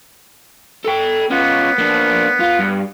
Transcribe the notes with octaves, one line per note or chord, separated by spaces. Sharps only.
A4 G5
B3 C#4 F4
A#3 D4
F4
G2